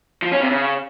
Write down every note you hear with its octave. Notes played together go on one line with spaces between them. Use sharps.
F3
C#4
C3
C#3